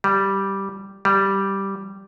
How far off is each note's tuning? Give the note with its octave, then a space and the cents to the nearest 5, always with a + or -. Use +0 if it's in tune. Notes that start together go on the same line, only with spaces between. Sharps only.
G3 -5
G3 -5